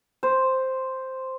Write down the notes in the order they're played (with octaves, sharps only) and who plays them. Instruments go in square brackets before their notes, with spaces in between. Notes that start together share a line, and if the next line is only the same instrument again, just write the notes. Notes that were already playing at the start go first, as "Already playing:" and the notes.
[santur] C5